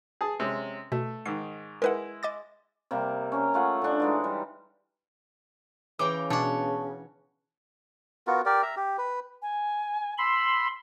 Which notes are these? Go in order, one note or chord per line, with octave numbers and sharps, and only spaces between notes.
G#4 A5
C3 G#3 C#4
B2 A3
G#2 D#3 C7
G#3 E4 A#4 B4 F#5
D#5 D6 A6
C3 G3 A#3 C4
C#4 A#5
A3 F4 F#5 G#5
D3 D4
E3 G#3 D#4
G3
C#3 E3 G5 A#5 D6
B2 D4 C#5 F#5 A5 C#6
B3 F4 F#4 A#4
G4 A#4 D5
E5 A#5
G4
B4
G#5
B5 C6 E6